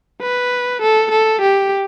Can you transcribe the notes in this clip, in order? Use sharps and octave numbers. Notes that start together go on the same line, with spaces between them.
B4
A4
A4
G4